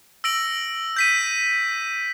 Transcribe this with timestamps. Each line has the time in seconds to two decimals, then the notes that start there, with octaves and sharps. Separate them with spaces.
0.24 E6 A#6 D7 F#7
0.96 G6 B6 D#7